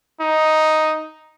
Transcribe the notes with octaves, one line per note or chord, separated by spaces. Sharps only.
D#4